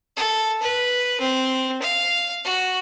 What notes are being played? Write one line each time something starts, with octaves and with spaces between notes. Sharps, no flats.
A4
B4
C4
F5
F#4